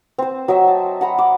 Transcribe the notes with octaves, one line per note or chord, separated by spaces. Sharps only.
C4 C5
F#3 D#5 E5
A5
F#5 A#5 B5
D6